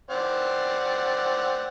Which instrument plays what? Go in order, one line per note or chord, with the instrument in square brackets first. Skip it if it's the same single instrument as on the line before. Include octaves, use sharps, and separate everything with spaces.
[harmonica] C4 D5 F#5